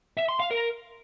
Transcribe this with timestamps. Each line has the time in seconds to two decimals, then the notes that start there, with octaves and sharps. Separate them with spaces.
0.17 E5
0.29 C6
0.40 F5
0.51 A#4